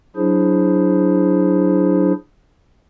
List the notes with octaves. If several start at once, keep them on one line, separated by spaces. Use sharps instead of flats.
F#3 D4 E4 G#4 C5